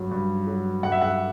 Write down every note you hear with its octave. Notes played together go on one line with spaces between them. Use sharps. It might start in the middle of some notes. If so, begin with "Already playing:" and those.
Already playing: G2 F#3
G2
F#3
G2 F#5
E5
F#5